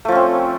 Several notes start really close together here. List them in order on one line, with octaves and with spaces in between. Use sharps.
A3 F3 C#4 C4